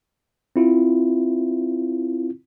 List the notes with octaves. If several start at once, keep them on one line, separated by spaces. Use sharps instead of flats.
C4 E4 F4